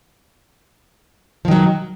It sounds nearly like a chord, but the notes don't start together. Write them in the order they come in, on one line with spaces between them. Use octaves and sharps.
F3 D#3 F#3